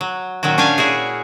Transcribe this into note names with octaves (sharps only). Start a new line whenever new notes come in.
F#3
A#2 D#3 F#3 C#4 F#4
C#4 D4 G4 F5 G#5
C#4 E4 F#4 G#4